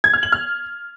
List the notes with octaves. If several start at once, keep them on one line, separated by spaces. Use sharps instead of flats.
G#6
F6
F#7
F6